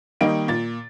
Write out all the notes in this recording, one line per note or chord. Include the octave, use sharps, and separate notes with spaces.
D#3 G3 A#3 D#4 D7
A#2 A6